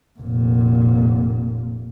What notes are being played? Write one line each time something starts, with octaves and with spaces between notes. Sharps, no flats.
F1 A#2